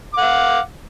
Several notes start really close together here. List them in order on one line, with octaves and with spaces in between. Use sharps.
D6 F#5 F5